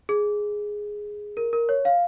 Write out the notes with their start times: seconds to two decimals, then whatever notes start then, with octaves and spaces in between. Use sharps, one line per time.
0.09 G#4
1.37 A#4
1.53 A#4
1.69 C#5
1.85 F5